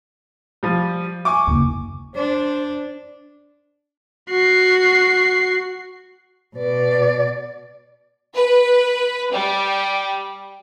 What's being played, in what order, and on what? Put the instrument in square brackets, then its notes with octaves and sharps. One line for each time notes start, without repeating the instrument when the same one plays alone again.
[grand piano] F3 G3
G#5 C#6 D6
[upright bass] F#1 D#2
[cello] D4 [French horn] C5
[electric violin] F#4 C7
[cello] B2 D5 [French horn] B4
[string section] B4
G3